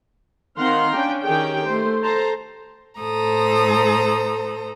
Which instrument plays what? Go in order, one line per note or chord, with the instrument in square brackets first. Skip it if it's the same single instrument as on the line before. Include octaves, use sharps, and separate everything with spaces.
[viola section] D#3 C4 F5 F#5 A#5 C6
C#4 D4 G5
D#3 C#4 G4 G#4 G5
A3 C5
A4 C5 A5 A#5
[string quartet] A2 A4 C5 A#5 D#6